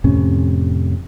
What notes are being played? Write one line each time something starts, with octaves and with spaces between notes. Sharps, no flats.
F2 A2 C3 C#4